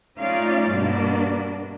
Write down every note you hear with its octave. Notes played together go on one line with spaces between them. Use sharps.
A3 C#4 D#4 F4 D5 F5
G2 B2 A#3 D4